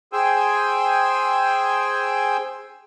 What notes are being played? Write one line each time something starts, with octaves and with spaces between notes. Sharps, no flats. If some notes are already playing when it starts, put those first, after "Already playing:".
G#4 C5 G5 G#5 E6